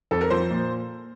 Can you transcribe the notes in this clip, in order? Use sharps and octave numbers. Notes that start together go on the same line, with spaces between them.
F2 A4
A#4
F3 C5
A#2